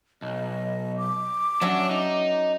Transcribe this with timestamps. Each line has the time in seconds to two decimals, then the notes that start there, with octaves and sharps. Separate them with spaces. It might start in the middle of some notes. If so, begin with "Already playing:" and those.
0.22 B1 D#5
0.97 D6
1.61 F#3 C#4 D4 E5
1.91 D#4